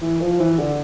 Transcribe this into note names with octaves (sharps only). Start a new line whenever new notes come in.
E3
F3
E3
D3